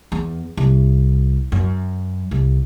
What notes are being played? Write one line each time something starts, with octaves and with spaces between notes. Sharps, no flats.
E2
C2
F#2
C2